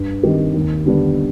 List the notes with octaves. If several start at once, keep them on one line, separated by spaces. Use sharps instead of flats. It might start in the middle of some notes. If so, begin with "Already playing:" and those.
Already playing: G2
D#3 G3 C4 G4
D#2
D3 G3 B3 D4